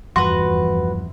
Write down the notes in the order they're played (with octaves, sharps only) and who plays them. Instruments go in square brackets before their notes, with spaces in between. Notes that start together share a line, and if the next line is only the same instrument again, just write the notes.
[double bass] F1 E3 [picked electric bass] E2 G2 F3 [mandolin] F#4 B4 [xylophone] C6